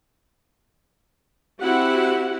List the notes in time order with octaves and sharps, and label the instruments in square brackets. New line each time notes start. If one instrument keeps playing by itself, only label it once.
[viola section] C4 E4 F#4 G4 F#5